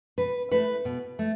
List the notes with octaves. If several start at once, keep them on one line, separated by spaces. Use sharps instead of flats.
B2 B4
A3 E4 B4
B2
A3